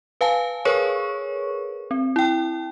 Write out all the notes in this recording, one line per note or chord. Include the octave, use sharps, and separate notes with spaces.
B4 F5 G#5 A5
G#4 A#4 B4 C#5 C#6
C4
E4 G5